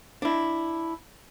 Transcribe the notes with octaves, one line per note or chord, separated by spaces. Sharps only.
D4 E4